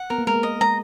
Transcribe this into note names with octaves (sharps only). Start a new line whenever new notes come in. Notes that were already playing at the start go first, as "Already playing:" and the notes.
Already playing: F#5
B3 A#4
A#3
G#3 A#4
A#3
D#5
G#3 A#5